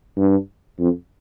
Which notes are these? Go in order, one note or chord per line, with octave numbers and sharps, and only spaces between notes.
G2
F2